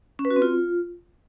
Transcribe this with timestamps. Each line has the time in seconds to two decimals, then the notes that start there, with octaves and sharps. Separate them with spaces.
0.19 C#4
0.25 B4
0.31 F#4
0.36 C4
0.42 F4